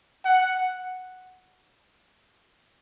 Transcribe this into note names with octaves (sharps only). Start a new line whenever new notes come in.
F#5